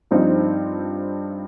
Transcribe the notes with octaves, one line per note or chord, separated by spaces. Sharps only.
G2 F3 C4 D#4